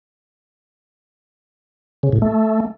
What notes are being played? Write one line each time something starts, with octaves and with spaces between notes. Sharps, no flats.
C#3
A2
A3